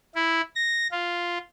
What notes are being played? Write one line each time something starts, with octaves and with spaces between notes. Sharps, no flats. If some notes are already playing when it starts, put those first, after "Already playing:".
E4
A#6
F4